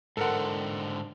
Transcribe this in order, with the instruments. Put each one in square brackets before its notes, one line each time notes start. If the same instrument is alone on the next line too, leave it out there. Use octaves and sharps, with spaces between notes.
[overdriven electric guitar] G#2 D3 [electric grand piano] A4 A#4 F#5